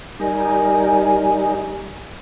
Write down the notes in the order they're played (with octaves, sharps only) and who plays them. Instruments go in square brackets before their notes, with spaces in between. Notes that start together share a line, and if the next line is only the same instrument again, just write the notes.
[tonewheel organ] G3 D#4 [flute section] A#4 G#5